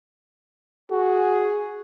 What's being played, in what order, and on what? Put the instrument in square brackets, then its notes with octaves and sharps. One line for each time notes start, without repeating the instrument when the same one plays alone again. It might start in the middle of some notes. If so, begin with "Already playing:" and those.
[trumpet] F#4 [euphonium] G#4